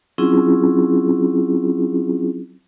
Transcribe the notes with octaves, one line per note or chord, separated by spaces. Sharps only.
F#3 C4 C#4 E4 F4 G#4